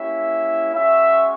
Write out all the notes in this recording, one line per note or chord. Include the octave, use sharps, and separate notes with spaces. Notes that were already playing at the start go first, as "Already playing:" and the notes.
Already playing: A#3 C#4 E4 G4 E5
G#3 C#4 F#4 E5